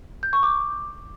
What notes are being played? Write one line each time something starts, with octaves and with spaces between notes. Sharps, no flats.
G6
C#6
D6